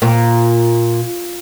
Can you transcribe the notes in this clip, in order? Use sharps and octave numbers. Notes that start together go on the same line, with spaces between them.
A#2